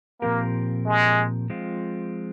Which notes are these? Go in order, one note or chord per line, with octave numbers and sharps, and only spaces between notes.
A#2 F3 A#3 C4 G4 A#4
G#3
F3 G#3 C4 F4